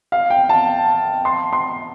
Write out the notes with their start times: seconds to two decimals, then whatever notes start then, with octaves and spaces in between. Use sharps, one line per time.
0.12 F5
0.30 G5
0.49 A5
1.25 C6
1.53 C6